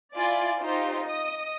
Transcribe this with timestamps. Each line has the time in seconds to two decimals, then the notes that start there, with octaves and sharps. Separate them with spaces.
0.15 E4 F4 D5 G#5
0.61 D#4 F4 G4 C5
1.05 D#5 D#6